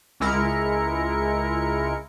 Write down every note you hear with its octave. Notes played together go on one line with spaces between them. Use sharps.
C#2 G#3 E4 A#4 C#7